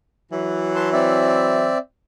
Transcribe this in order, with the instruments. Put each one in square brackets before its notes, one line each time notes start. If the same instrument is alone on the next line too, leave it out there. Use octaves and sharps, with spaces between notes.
[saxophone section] E3 F#3
[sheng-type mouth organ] B4 A5 C6
C4 D5 E5